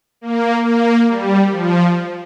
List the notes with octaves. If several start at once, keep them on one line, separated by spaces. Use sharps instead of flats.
A#3
A#3
G3
F3